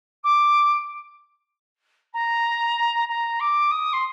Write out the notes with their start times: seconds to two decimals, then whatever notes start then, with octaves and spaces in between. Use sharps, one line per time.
0.23 D6
2.13 A#5
3.08 A#5
3.40 D6
3.71 D#6
3.92 C6